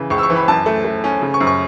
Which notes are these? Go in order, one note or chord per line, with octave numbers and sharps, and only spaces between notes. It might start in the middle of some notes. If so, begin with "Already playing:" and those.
Already playing: C#3 E3
C#2 C#6
E6
C#6
E3
B5
F#2 A5
A3
A3
C#4
C#3
C#6
F#2
C#6